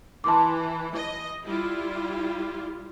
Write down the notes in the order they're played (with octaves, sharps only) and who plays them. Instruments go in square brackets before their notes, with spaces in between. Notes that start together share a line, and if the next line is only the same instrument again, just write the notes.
[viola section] E3 [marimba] A5 C6 D6
[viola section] D#5
G3 E4 F4